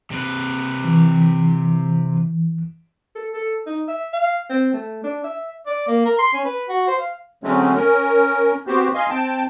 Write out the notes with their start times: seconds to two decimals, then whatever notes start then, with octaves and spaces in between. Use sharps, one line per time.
0.11 C3 B4
0.84 E3
3.15 A4
3.33 A4
3.66 D#4
3.88 E5
4.13 F5
4.50 C4
4.73 A3
5.04 D4
5.24 E5
5.67 D5
5.88 A#3
6.05 A#4
6.19 C6
6.34 C#4
6.45 B4
6.69 F#4
6.87 C5
6.99 F5
7.44 D3 F#3 G#3 A3 C4 C#4
7.75 C#4 A#4
8.67 B3 C4 F#4 G4 C5
8.94 D#5 F5 G#5 C6
9.09 C4 G5 A5